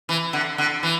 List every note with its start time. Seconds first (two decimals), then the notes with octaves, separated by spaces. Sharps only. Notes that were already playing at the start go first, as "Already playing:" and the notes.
0.09 E3
0.33 D3
0.58 D3
0.83 E3